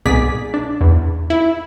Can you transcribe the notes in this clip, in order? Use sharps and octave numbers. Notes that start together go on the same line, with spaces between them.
C2 G#2 B2 G#4 D5 B6
D4
E2
E4